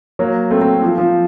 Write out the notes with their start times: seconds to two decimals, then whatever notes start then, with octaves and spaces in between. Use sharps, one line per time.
0.19 F#3 A#3
0.51 A3 C4
0.61 A3 C4
0.83 F3
0.98 F3